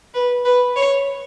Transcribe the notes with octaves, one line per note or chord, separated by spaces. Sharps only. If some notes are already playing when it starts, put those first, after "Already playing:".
B4
B4
C#5